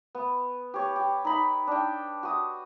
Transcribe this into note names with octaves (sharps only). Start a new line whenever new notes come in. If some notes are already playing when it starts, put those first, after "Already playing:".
B3
G4 C#5
G4
D#4 B5
D4 G5
F#4 D#6